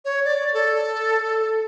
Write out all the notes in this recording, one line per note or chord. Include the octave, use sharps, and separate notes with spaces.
C#5
D5
A4